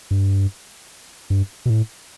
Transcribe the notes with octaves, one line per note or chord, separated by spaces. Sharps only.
G2
G2
B2
A2